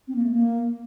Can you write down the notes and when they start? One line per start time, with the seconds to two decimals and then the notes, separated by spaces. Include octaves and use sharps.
0.08 C4
0.16 A#3
0.24 A3
0.31 A#3